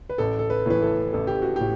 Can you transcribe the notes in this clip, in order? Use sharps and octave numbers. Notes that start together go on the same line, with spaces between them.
B4
A1 A4
A4
B4
A2 E3 B4
A4
A1 A4
G4
F#4
A2 G4